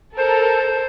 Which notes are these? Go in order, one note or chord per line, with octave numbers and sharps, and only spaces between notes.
A4 A#4 C5